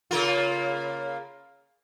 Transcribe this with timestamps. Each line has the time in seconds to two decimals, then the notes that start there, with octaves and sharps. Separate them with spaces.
0.11 C#3 A#3 F4